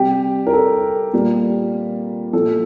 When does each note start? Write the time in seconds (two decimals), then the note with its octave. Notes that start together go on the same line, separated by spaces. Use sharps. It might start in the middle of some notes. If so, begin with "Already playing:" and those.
Already playing: C3 G3 G4
0.47 A#4
0.53 A4
1.13 A#2 G3
2.33 A#2 F3 A4